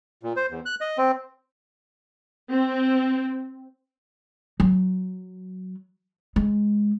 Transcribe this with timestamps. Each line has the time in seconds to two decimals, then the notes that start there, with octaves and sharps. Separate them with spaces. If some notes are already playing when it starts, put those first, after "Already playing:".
0.23 A#2
0.36 C5
0.50 E2
0.66 F#6
0.81 D#5
0.98 C4
2.50 C4
4.60 F#3
6.36 G#3